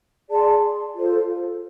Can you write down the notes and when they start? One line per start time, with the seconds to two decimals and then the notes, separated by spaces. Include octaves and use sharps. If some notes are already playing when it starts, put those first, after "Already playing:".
0.30 G#4 D5 A5 C6
0.95 F4 A4 C5